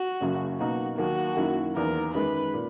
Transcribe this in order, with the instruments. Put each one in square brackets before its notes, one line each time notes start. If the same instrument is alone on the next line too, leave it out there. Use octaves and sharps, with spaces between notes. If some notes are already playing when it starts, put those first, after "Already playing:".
Already playing: [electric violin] F#4
[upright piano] F#1 F#2 C#3 F#3 C#4
[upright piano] B2 A#3 D#4 A#4 [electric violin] F#4
[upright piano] D#2 D#3 F#3 A#3 [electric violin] F#4
[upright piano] F#2 D#3 F#3 A#3 E4
[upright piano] E2 D#3 A#3 [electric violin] A#4
[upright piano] F#2 D#3 G#3 [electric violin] B4
[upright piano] A#2